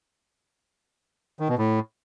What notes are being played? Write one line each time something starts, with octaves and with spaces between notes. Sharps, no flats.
D#3
B2
A2